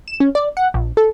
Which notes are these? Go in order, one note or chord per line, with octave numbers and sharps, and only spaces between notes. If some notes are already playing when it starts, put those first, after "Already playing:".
E7
C#4
D5
F#5
A#1
A4